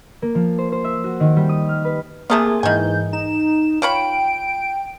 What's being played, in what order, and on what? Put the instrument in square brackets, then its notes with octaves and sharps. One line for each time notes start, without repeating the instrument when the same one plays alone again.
[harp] A#3
F3
C5
C5
E5
F#4
D#3
G3
D#6
F6
B4
[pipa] C3 A3 F4 [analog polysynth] A#3 G#4 [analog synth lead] D#6
[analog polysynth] G#2 E3 [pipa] D#3 G#5 [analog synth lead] G6
[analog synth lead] D#4 [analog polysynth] E7
[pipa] F4 C#5 B5 [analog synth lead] G5 [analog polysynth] D7